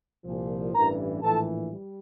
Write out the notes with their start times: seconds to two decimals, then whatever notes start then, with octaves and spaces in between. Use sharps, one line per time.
0.24 C2 A#2 F3
0.73 A1 G2 E3 A#4 A#5
1.21 A#1 A2 E3 A4 A5
1.70 G3